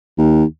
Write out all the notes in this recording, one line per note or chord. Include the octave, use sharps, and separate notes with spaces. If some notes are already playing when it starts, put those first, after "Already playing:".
D#2